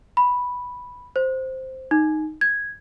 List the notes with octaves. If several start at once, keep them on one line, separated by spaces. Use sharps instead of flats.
B5
C5
D#4
G#6